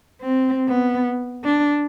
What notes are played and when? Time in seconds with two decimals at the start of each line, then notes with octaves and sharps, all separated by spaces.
0.22 C4
0.68 B3
1.45 D4